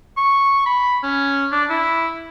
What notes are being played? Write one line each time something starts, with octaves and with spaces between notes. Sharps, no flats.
C#6
B5
C#4
D4
E4